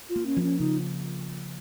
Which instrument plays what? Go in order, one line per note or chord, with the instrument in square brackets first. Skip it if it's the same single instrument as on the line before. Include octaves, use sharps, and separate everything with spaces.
[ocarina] F4
[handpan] A#3
[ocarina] C#4
[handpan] F3
[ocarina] C#4
[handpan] C#3 [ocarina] D#4